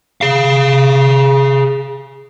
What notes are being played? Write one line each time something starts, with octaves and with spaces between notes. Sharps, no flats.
G#4 F5